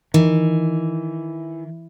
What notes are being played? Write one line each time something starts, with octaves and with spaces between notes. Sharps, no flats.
D#3 E3